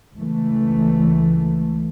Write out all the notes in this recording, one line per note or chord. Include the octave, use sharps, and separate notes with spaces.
C#2 E3 A3